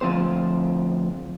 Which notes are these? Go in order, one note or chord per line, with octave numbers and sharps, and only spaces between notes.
D2 F3 C4 C5